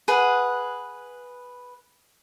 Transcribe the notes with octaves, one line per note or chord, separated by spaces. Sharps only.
G#4 B4 F#5